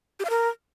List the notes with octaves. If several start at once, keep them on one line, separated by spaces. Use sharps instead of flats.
G4
F5
A#4